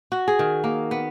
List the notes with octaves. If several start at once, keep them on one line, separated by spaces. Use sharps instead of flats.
F#4
G#4
D#3
A#3
B3